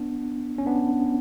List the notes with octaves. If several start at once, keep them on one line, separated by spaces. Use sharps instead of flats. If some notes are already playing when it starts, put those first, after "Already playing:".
Already playing: B3 D4
C#4
B3 D4